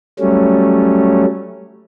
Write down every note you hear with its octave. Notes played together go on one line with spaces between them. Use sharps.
F#3 G3 A3 C#4